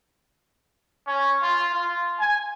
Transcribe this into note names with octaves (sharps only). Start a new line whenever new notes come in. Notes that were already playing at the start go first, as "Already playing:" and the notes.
C#4
F4
F4
G#5